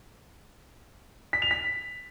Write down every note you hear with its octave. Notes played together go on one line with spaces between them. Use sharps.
B6
F7
B6